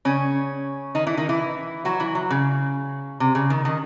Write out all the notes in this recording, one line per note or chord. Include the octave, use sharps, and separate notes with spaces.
C#3 C#4
D#3 D#4
E3 E4
D#3 D#4
E3 E4
F#3 F#4
E3 E4
F#3
C#3
C3
C#3
D#3
D#3